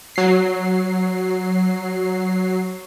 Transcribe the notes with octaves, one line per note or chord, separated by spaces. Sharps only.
F#3 C7